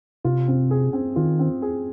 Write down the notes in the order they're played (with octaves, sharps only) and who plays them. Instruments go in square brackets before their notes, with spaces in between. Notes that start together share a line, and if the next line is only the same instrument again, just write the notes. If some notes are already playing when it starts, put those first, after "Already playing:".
[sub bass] C3 [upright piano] F4
[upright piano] C4
G#4
C4
[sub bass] D#3 [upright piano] F4
[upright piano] C4
G#4